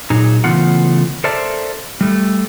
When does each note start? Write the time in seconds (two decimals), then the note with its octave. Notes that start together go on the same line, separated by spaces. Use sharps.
0.10 A#2 F#3 D#4 G#4
0.44 C#3 E3 A3 B3 F4 F#5
1.24 A4 A#4 C5 D5 E5 A5
2.01 G3 A3